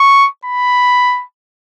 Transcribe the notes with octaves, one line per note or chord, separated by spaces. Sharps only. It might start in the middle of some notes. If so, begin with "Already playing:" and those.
Already playing: C#6
B5